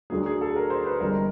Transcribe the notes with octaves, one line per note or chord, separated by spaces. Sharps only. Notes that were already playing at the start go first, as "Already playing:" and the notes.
D2 D3 F#3 A#3 G#4
G#4
A4
A#4
C5
B4
G1 G2 E3 G#3 C4 A#4